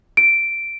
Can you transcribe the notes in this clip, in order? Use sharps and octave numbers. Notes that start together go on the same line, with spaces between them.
D7